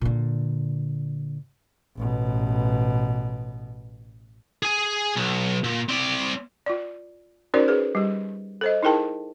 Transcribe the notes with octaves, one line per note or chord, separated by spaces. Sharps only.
A#2 D3
A1 B2
G#4 G#5
B1
A#2
C4 D5
F4 D5
C#4 D#4 F#4 A#4 C5 D5
G#4 B4
G3 G4
A4 C5 D#5
D#4 E4 G#4 A#4 G5 A5